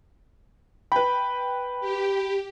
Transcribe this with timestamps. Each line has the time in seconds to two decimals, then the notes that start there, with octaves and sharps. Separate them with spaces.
0.92 B4 G5 B5
1.80 G4